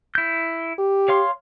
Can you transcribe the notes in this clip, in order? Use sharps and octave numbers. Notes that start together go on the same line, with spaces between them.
E4 G6
G4
C#5 F5 C6